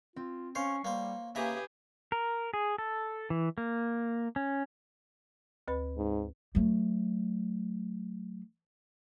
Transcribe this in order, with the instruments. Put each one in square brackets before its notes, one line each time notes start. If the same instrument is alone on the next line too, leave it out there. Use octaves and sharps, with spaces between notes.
[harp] C4 [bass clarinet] F4
[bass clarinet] C#4 [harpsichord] C5 F5 [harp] C#5 C7 C#7
[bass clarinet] G3 [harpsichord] A#3 C5
[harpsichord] C#3 E5 A#5 [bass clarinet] A#3 [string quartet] G4 G#4 B4
[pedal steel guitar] A#4
G#4
A4
E3
A#3
C#4
[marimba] D2 B4 B5
[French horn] G#2
[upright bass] F#3 A3